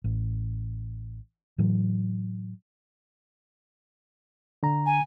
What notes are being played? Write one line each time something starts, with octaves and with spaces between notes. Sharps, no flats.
A1
A2 E3 F#3
D3 A#5
G#5